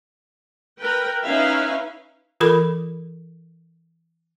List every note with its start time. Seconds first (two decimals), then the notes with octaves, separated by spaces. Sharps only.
0.80 A#4 B4 G5
1.26 C#4 D#4 E4 B4 E5 F5
2.40 E3 F4 A4 A#4 B5